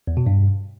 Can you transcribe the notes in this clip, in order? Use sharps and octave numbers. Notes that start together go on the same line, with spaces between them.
E2
B2
G2